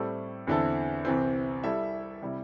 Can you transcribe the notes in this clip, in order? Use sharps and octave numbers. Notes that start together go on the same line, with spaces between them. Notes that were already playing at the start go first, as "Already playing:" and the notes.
Already playing: A2 G3 C4 E4 A4
E2 D3 C4 E4 A4
C2 C3 E3 C4
G3 E4 A4 E5
C3 G3 E4